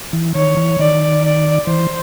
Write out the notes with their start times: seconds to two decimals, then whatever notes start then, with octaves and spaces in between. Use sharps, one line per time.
0.13 E3
0.35 D#3 C#5
0.57 E3
0.79 D#3 D5
1.23 D5
1.67 E3 C5